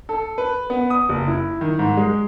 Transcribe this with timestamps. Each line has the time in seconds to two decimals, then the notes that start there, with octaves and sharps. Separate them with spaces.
0.09 A4
0.38 B4
0.70 B3
0.90 D#6
1.09 F#1
1.28 E4
1.61 D#3
1.79 G#2
1.97 G#3